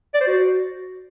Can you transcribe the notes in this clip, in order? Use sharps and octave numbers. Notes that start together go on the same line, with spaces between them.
D5
C5
F#4